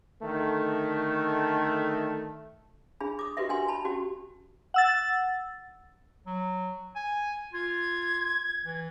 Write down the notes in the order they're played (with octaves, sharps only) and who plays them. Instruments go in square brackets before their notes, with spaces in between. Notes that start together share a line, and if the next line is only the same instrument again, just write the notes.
[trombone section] D3 D#3 A3
[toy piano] D4 G#4 B5
D6 D#6
F#4 G4 B4 D#5 E5
D4 A#4 F#5 G#5 C6
A5 B5
C#4 F#4 G4
[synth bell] F#5 E6 A6
[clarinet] F#3
G#5
[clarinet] F4 [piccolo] G#6
[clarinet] E3